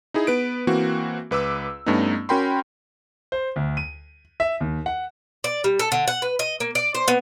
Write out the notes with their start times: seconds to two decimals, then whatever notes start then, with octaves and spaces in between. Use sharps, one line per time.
0.14 D#4 E4 G#4
0.27 B3 B4 D7
0.67 E3 A#3 C4 F#4
1.31 C#2 B4 D6 E6
1.86 G2 A3 B3 C#4 D#4
2.29 C#4 F#4 A#4 G5 B5 C6
3.32 C5
3.56 D2
3.77 D#7
4.40 E5
4.61 D#2
4.86 F#5
5.44 D5
5.64 G3
5.79 A4
5.92 D3
6.08 F#5
6.22 B4
6.39 D#5
6.60 A#3
6.75 D5
6.95 C5
7.08 B3